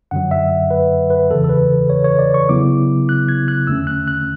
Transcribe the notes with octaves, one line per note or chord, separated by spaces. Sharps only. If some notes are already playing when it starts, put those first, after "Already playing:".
F#2 D3 F#3 F#5
E5
B4
B4
E2 C#3 E3 A4
A4
B4
C#5
C#5
D5
C#6
C#3 F#3 B3 E4 D6
F#6
G#6
F#6
E2 D3 A3 C#4 E6
F#6
F#6